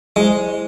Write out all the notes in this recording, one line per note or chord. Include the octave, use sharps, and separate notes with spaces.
G#3 E4 G#4 C5